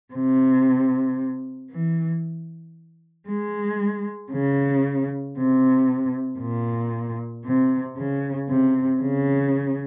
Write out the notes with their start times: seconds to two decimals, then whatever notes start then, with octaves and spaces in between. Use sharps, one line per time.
0.14 C3
1.70 E3
3.27 G#3
4.30 C#3
5.35 C3
6.39 A#2
7.44 C3
7.95 C#3
8.48 C3
9.00 C#3